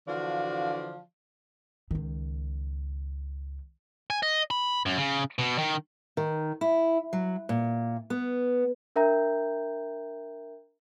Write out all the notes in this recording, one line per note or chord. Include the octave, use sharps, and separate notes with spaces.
D3 E3 F3 F#4 D5 F5
C#2 D#3
G#5
D#5
B5
F#2
C#3
B2
D#3
D#3
E4
F#3
A#2
B3
D4 A#4 E5 G5 A#5 G6